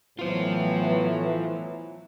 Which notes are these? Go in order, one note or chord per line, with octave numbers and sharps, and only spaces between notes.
A2 E3 F#3 A3 B3 F4 C5